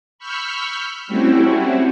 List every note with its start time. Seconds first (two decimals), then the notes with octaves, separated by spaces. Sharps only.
0.19 B5 C#6 E6 F6 G6 B6
1.07 G3 A3 C4 C#4 E4 F#4